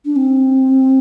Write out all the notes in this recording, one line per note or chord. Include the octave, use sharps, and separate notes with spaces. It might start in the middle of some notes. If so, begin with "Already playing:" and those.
D4
C4